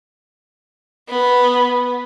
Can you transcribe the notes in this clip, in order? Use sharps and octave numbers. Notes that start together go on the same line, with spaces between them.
B3